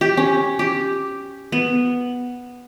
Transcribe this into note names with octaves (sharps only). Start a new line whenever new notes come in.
G4
C#4
G4
B3